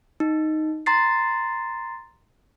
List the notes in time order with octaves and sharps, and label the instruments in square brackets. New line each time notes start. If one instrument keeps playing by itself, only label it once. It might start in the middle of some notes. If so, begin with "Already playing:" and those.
[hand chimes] D#4
A#5 C6 A6 C7